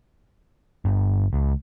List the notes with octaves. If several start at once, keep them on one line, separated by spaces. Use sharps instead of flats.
G1
C#2